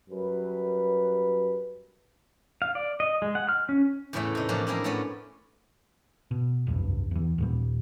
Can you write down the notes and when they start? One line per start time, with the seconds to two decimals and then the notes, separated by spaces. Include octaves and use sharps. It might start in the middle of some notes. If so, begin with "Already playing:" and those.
0.10 F#2 G3 B4
2.62 F5
2.75 D5
3.00 D#5
3.22 G#3
3.35 F#5
3.49 F6
3.69 C#4
4.13 E2 A2 C#3 E3 A3
4.35 C3 D#4
4.49 A2 E3 F3 A#3 C#4 D4
4.67 A#3 C4 E4 G#4 A#4
4.84 A2 A3 B3 C#4 A4 D5
6.31 B2
6.67 F1 C2 G2
7.11 E2 E3
7.38 D#2 A#2 G3